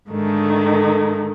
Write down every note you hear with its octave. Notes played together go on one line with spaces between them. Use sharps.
G#2 D3 D#3 A3